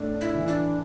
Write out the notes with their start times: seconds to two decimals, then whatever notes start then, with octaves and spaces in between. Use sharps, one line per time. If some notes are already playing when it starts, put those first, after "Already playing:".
Already playing: A2 A3 D4
0.14 D4
0.21 E4
0.35 E3
0.47 D4
0.55 E3